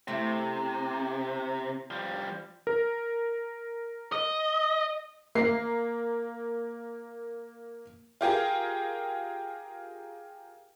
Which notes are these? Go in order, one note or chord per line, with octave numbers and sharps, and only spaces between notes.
C3 A3 E4
F3 G3
A#4
D#5
A#3 C7
F4 G4 G#4 A#4